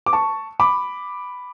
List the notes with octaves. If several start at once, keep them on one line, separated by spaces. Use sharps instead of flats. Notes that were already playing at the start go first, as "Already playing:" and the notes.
D6
A5 C#6
B5 D6